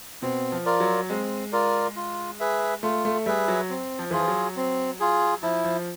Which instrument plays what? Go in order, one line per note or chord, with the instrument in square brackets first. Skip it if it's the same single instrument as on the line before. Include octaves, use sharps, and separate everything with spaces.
[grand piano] B2 [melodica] C4
[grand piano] F3
[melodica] F4 A#4 D5
[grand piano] F#3
[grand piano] G#3 [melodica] C4
[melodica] F4 A#4 D5
F4
G#4 B4 E5
[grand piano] A3 [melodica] F4
[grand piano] A3
[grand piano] G3 [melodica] G#4 B4 E5
[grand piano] F#3
[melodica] C4
[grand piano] F3
[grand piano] E3 [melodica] F4 G#4
[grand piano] F3
F#3
[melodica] C4
F4 G#4
[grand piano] F3 [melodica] E4
[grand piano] F3